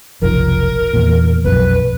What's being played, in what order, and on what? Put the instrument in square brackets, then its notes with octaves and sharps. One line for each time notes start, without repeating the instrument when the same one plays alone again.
[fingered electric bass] F1 B1 F3 [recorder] A#4
[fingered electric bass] E2 A#2
[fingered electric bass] B1 F2 [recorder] B4